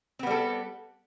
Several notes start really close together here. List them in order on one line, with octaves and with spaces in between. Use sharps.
C4 B3 G3 A4